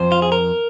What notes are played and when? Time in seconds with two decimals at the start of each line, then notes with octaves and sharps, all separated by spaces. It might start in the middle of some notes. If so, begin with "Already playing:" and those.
Already playing: F2 F3 C5
0.12 F4
0.22 G#4
0.32 A#4